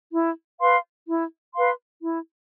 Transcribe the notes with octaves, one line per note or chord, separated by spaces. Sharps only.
E4
B4 F5 C6
E4
B4 F5 C6
E4